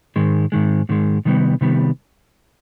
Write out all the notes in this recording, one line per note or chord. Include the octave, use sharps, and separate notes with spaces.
G#2 D#3 G#3
G#2 D#3 G#3
G#2 D#3 G#3
C3 D#3 G3 B3
C3 D#3 G3 B3